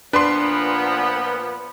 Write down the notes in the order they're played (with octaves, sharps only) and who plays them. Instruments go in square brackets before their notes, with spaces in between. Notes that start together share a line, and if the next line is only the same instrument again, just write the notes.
[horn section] A#2 F3 B3 [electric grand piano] D4 C6 [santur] B4